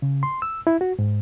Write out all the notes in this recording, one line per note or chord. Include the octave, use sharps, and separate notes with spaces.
C#3
C6
E6
E4
F#4
G#2